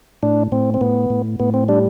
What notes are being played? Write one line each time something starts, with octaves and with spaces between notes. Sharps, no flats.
A2 D4
A2 C4
C4
A2 B3
A2
A2 B3
C4
G3 D4